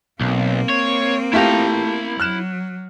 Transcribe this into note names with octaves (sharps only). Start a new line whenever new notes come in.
B1 A#3 C4
C#5
A3 E4 F4 G4 A#5
F#3 F6 F#6 E7